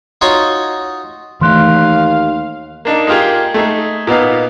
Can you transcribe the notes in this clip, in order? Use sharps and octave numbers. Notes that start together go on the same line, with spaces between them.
D#4 F4 F#4 C#5 D#5
D#2 E3 A3 F5 C6 F#6
A#3 D4 D#4
G#3 A#3 F4 G4 G#4
A3 D#4 G#4
A#2 B3 D#4 F5